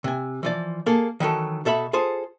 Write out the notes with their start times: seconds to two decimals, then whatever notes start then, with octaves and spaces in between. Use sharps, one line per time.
0.04 C3 G#5
0.43 E3 F3 D5
0.86 A#3 G#4 A4
1.20 D#3 E3 F#3 A4
1.65 B2 A4 E5 B5
1.93 F4 G#4 A4 C5